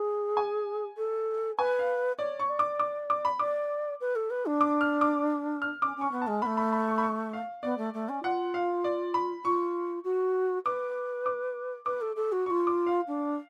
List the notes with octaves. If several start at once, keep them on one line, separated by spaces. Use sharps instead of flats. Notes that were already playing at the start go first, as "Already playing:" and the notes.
Already playing: G#4
G#5
A4
B4 G#5
F5
C#5 D5
C#6
D5
D6
D6
D6
B5
D5 D6
B4
A4
B4
D4
D6
F6
D6
F6
C#4 D6
C#4 C#6
B3
A5
G#3
A3 B3 B5
B5
B5
C#6
B5
C#6
F5
B3 D5
A3
A3
C#4
F4 F#5
F5
D5
B5
F4 C#6
F#4
B4 D6
D6
B4 D6
A4
A4
F#4
F4 F#4 C#6
D6
F5
D4